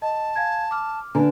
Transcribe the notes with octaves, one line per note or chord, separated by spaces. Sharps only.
D#5 A5
F5 G#5 G#6
D6 F6
D3 D4 B4 G#5 A#5